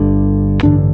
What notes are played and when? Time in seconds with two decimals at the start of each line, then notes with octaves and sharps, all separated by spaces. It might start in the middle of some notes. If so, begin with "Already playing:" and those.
Already playing: G1 G2 D3
0.63 A1 G2 D3 D4